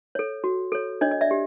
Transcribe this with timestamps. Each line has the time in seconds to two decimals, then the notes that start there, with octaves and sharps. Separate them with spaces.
0.15 A4 C#5
0.44 F#4
0.72 A4 C#5
1.01 D4 C#5 D#5
1.11 D#5
1.21 D5 E5
1.31 G4